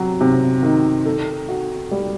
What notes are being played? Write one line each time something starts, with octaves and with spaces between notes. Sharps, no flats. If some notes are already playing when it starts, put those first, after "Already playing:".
Already playing: C3 F#3
C3
D#3
A4
F#4
G3